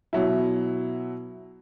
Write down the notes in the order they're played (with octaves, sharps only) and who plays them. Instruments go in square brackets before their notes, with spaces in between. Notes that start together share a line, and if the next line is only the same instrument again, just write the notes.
[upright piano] B2 F#3 E4